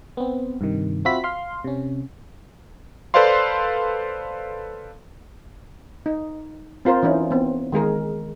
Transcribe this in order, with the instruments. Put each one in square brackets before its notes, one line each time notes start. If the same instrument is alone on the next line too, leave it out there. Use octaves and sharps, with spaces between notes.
[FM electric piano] B3 C4
G2 C3 D#3
C4 F4 F#4 E5 B5 B6
F5 C6
C3 C#4
[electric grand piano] A4 B4 C5 D5 F5 C6
[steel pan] D#4
C4 F4 A#4 C5
E3 C#4 D#4 E4
B3 C4
D#3 G#3 G#4 A#4